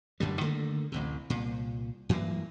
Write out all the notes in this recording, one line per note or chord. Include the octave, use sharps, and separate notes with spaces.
A1 F#2 D3 G3
D3 D#3 A3 A#3
A1 D2 C3
C2 A#2
G2 E3 F#3 A#3